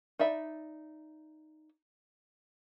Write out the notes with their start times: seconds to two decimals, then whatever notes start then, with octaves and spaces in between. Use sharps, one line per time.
0.19 D#4 D5 E5 B5